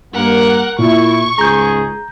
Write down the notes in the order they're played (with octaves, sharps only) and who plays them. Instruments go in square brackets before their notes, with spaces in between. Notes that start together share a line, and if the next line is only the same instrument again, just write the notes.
[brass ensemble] G2 A#3 [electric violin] A#4 F#5
[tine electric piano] A#2 [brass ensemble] E4 [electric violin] C#6
[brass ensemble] C#2 G#2 G#4 [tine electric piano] A#5 G6